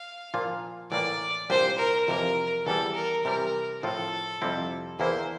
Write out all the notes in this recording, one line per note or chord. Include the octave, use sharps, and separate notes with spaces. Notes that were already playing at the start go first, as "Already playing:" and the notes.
Already playing: F5
A#2 F3 A#3 F4
A2 E3 A#3 D5
C2 A#2 G3 D4 G4 C5
A#4
F2 C3 E3 A#3 A#4
E2 E3 G3 A4
A#4
C3 E3 G3 A#4
A2 F3 C4 F4 A4
F2 C3 G3 C4 E4
E2 E3 A#3 E4 C5